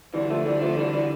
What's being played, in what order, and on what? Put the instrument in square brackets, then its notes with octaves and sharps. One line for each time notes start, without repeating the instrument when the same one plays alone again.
[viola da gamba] D3 [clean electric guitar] E3 G3
[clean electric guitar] F3 A3
E3 G3
F3 A3
E3 G3
E3 G3